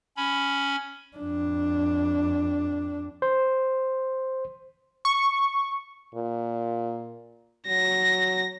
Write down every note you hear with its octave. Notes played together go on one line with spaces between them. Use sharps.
C#4 B5
F2 D4
C5
C#6
A#2
F#3 A#6